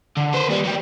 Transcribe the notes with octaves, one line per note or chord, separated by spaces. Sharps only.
D3
B4 C5
D#2 G3
F#3 G4